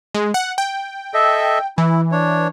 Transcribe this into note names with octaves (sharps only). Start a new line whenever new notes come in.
G#3
F#5
G5
A4 D#5 E5
E3 E4
D4 C#5